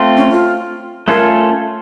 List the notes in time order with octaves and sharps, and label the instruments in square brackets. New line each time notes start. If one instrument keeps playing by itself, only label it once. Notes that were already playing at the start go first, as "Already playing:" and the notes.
Already playing: [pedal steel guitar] A3 C4 F4
[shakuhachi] C#4
F4
[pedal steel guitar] A3 C#4 F4 A4 [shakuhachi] A#4